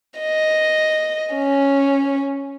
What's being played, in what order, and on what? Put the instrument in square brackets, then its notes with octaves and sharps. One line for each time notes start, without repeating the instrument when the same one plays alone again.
[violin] D#5
C#4